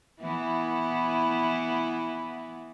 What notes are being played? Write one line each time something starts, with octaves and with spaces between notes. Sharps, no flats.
E3 B3 E4